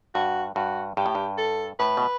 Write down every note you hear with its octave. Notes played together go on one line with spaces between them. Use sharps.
G2 F#4
G2 F#4
G2 G4
A2
G2
A4
A2 B4
B2